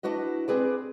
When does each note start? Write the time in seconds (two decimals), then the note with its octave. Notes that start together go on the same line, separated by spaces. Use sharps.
0.03 D4 E4 F#4 B4 D#5
0.48 C4 G#4 B4 D5